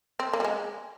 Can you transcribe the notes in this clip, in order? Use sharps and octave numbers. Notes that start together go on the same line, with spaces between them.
C4
A#3
G3
G#3